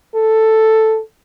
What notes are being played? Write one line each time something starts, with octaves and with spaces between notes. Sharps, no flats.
A4